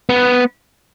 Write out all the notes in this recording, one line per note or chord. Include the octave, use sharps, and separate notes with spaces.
B3